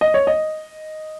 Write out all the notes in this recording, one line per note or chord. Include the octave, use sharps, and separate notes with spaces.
D#5
C#5
D#5